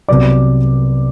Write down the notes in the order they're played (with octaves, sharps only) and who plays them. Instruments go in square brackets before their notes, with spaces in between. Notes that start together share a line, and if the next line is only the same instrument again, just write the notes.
[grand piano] C2 C3 F#3 B3 D5 D6